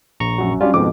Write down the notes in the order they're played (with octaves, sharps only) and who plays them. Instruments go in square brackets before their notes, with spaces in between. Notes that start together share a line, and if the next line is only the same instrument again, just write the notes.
[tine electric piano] A#1 A#5 C#6
[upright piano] F#2 F#4
[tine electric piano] F#3 F4 [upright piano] G3 C#4 D4
[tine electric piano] F2 G#2 B2 [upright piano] D6